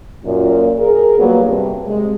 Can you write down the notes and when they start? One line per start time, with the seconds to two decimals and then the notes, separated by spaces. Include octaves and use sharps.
0.24 F#2 A#2
0.78 G#4 A#4
1.18 G2 A#2 F#3 A#3 B3
1.47 G2 C3
1.85 C3 G#3